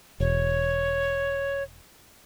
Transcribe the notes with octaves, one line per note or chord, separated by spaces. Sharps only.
E1 C#5